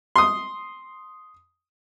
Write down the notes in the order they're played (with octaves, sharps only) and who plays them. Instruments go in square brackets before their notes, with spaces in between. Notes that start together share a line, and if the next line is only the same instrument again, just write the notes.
[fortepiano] C6 D#6